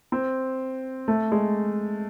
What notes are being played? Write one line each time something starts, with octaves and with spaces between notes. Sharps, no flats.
C4
A3
G#3